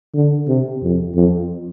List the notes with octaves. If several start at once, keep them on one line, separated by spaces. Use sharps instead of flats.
D3
C3
F2
F2